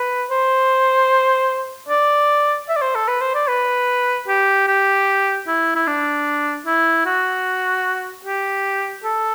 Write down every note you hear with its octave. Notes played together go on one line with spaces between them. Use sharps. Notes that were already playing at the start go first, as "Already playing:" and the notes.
Already playing: B4
C5
D5
E5
D5
C5
A4
B4
C5
D5
B4
G4
G4
E4
E4
D4
E4
F#4
G4
A4